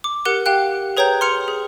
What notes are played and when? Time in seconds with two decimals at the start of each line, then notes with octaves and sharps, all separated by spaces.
0.04 D6
0.25 G4 A#4 F#5 F#6 C#7
0.46 G4 F5 G5 F#6
0.97 G#4 B4 C#5 G5 A#5 G6
1.21 C6 F6 C#7 F7
1.48 G#4